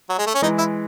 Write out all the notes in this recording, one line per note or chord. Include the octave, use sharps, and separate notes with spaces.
F#3
G#3
A3
C#4
E3 G#3 D#4
E4